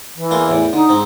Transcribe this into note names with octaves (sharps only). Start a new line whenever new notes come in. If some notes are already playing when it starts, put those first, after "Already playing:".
E3
E2 A#3 C6
E2 A2
D3 D#4
G#2 C4